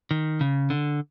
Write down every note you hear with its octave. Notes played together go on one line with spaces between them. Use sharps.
D#3
C#3
D3